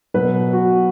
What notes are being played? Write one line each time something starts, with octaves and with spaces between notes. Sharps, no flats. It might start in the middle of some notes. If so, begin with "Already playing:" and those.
B2 F#3 B4
F#4